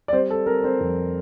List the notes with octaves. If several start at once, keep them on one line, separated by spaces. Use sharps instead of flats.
D5
G3 C4 C5
A4
C4 A#4
C4 C5
F2